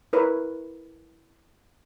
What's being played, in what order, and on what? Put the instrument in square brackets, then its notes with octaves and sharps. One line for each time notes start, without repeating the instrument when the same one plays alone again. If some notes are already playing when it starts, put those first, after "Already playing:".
[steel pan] E4 A#4 B4 C#5